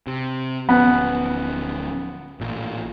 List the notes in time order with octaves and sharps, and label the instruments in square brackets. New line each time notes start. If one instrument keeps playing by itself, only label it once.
[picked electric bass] C3
[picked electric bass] D1 F3 C#4 [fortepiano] B3
[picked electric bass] A1 A#2